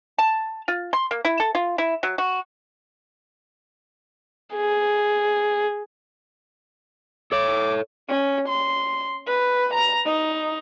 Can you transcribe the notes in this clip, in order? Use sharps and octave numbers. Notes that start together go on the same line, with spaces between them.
A5
F4
C6
A#3
E4
A4
F4
E4
F#3
F#4
G#4
A4 C#5 D6
C#4
C6
B4
A#5
D#4